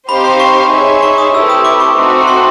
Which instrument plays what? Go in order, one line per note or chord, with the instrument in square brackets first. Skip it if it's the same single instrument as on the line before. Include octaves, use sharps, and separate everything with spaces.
[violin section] C4 D#4 G4 C5 F5 [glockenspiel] B5
[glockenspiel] C6
C#6
[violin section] D#4 G#4 C#5 E5
[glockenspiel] C#6
D#6
[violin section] A3 C4 E4 G4 B4 [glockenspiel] E6
[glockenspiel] D#6
D6
C#6
[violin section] A3 C4 D#4 F#4
[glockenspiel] C6